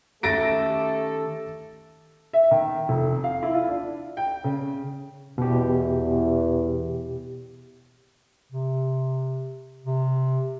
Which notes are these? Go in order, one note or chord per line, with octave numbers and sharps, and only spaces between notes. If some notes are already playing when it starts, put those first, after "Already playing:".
D#3 A3 C#4 G4 A4 A6 A#6 D7
E5
D#3
F1
F5
E4
F4
D4
G5
C#3
E2 B2 G4
C3
C3